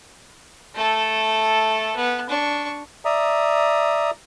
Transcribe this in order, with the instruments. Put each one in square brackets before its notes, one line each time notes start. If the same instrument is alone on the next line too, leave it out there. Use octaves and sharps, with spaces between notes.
[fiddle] A3 A4
B3
D4 C#6
[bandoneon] D5 E5 A#5 D#6